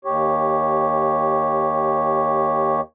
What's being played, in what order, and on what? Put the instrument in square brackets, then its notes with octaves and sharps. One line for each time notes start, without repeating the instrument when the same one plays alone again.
[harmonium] D#2 G4 C#5